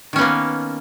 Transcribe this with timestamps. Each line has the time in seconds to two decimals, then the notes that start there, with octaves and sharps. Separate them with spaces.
0.13 D#3
0.16 C#4
0.18 B3
0.21 A#3